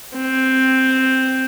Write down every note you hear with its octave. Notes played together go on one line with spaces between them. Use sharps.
C4